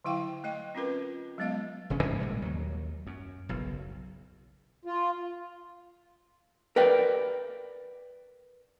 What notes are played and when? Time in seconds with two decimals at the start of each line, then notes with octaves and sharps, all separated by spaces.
0.04 D3 F#3 E4 F5 G5
0.44 A3 D#5 G5
0.75 C4 C#4 F4 A#4 B4
1.38 F#3 G#3 B3 D#5 F5
1.90 E1 C#3 C#4
2.03 G#2 E3
2.19 G#1 A#2 G3 G#3
2.42 D#2 F#3
3.07 F#2
3.49 F#1 B1
4.85 F4
6.76 A#4 B4 D5 G5